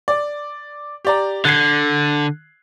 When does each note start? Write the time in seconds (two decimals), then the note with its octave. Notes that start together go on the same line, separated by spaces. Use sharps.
0.08 D5
1.05 G4 D5 A#5
1.45 D3 F#6 G#6 C7